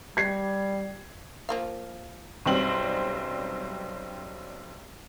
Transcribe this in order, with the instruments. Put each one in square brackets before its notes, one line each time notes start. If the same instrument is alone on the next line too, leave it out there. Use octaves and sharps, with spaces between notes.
[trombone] G3 [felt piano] G#6 C7
[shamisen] F3 A#3 F5
[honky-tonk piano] B1 F#2 G3 C4 F#7